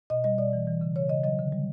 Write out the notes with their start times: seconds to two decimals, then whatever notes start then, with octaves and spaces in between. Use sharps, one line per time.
0.10 B2 D#5
0.24 G3 D#5
0.38 B2 D5
0.53 E3
0.67 E3
0.81 C#3
0.96 C#3 C#5
1.09 C#3 D#5
1.24 F#3 D#5
1.39 D3
1.52 G3